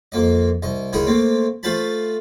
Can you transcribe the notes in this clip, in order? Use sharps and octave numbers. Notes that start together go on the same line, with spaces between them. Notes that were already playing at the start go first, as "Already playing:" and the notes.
F2 A#3 D#5
C2 D#5
C#2 D#4 E4 G#4 A#4 D#6
A3 A#3 C4
A3 F4 C5 A5 B5